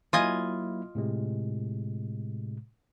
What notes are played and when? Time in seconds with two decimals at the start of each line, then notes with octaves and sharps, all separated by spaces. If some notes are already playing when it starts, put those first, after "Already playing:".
0.13 F#3 A#3 E4 F4 D#5 G#5
0.95 A2 C3 G#3